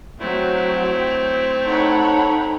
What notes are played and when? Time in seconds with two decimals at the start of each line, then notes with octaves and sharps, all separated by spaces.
0.20 F#3 A3 C4 E4 G5
1.66 D#4 A4 C#5 F#5 B5